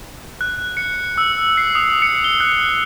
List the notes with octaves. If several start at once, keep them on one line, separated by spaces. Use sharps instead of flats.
F#6
C#7
E6
C7
D#6
C#7
G7
F#6